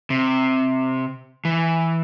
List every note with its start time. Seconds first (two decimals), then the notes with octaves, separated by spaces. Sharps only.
0.10 C3
1.45 E3